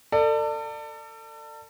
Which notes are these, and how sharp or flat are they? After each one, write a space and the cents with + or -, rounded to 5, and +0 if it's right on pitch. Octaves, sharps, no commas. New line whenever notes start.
A4 +35 D5 +25